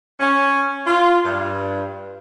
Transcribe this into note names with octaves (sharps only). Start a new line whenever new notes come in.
C#4
F4
G2